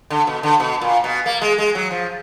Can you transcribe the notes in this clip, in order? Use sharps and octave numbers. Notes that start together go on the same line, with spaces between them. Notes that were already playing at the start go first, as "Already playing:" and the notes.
D3
B2
D3
B2
A#2
B2
A#3
G#3
G#3
F#3
F3